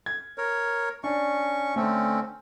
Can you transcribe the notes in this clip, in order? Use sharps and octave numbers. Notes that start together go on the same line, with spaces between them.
G#6
A#4 C#5
C#4 D4 C#6
D3 A3 C4 C#4